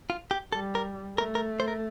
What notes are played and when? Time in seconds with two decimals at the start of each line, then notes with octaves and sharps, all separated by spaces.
0.10 F4
0.31 G4
0.53 G3 A4
0.75 A#4
1.18 A3 A#4
1.35 A#4
1.60 C5
1.68 A#4